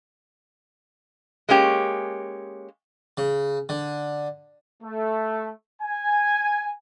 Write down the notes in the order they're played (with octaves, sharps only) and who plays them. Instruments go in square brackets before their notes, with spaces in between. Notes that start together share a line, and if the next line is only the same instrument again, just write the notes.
[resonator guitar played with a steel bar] G#3 A#3 C#4 G4
[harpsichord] C#3
D3
[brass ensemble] A3
G#5